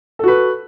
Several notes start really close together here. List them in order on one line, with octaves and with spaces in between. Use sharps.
A4 F#4 B4